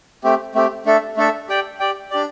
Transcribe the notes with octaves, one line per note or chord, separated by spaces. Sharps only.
A3 C4 G4
A3 C4 G4
A3 D4 A4 E5
A3 D4 A4 E5
G4 D5 G5
G4 D5 G5
D4 G4 D5